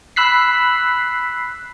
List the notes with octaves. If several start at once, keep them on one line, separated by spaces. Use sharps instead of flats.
B5 E6 F#6 B6 C7